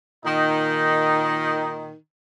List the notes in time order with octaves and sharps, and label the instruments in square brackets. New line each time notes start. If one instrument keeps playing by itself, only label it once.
[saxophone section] A#2 D#3 [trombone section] D#4